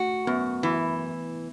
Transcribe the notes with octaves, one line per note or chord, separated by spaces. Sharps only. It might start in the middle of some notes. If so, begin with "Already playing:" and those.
Already playing: A3 F#4
F#2 B3
E3